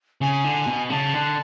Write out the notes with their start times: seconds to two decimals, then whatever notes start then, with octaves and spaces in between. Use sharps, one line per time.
0.21 C#3 G#5
0.44 D3
0.67 B2
0.90 C#3 A5
1.14 D3